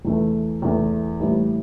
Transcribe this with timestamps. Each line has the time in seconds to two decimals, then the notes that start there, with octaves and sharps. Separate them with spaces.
0.05 E2 E3 A3
0.62 E2 E3 A3
1.20 A2 E3 G3